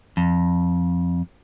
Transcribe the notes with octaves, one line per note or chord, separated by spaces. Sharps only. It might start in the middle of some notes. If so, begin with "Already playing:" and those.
F2